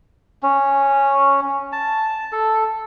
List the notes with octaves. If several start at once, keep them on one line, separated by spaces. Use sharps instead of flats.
C#4
A5
A4